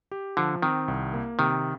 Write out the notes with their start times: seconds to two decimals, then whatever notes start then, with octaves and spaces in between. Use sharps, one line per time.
0.11 G4
0.37 D3 F3
0.62 D#3 C4
0.88 C2
1.13 A#3
1.39 C3 D#3